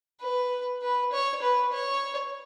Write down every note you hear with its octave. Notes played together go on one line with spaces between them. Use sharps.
B4
B4
C#5
B4
C#5